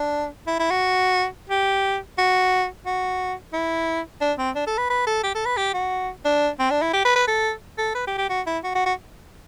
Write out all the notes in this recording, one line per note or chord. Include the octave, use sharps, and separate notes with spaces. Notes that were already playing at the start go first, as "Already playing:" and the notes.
Already playing: D4
E4
E4
F#4
G4
F#4
F#4
E4
D4
C4
D4
A4
B4
B4
A4
G4
A4
B4
G4
F#4
D4
C4
D4
E4
G4
B4
B4
A4
A4
B4
G4
G4
F#4
E4
F#4
F#4
F#4